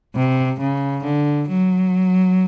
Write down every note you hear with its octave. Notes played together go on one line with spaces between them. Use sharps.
C3
C#3
D3
F#3